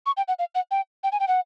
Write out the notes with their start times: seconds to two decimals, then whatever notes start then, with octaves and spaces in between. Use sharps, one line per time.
0.06 C#6
0.17 G5
0.28 F#5
0.39 F5
0.55 F#5
0.71 G5
1.04 G5
1.12 G#5
1.20 G5
1.28 F#5